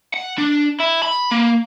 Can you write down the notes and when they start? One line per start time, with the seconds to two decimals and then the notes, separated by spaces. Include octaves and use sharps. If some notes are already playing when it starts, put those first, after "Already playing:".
0.14 F#5
0.38 D4
0.80 E4
1.03 B5
1.31 A#3